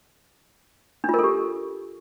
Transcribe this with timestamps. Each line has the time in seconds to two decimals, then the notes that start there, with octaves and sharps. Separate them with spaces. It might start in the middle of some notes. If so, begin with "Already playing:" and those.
1.04 D4
1.09 F4
1.14 A#4
1.19 A4
1.24 G4